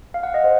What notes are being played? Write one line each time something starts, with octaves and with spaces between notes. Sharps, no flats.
F5
F#5
D#5
C5